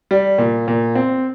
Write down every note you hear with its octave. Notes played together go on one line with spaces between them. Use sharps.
G3
A#2
A#2
C4